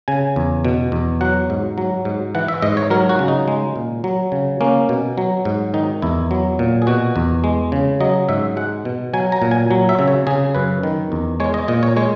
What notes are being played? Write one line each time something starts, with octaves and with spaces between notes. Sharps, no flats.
C#3 G#5
E2
B2
E2
F#3 F#5
G#2
F#3
G#2
E3 F#5
E5
G#2 D#5
C#5
F#3 A#4
F#4
C#3
D#4
G#3
A#2
F#3
C#3
A#3 C#4
B2
F#3
G#2
D#3 D#4
E2 E4
F#3
A#2
G#4
B2 F#4
E2
G#3
C#3
F#3 D#5
G#2 E5
G#3 F#5
B2
F#3 G#5
A#5
A#2
G#5
F#3
E5
C#3
C#5
C#3 G#4
F#2 B4
D#3
E2
G#3 C#5
D#5
A#2 D#5
C#5
G#3 C#5